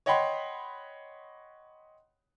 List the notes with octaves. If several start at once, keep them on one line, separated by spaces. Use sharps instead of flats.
C#5 D#5 F#5 G5 B5 C6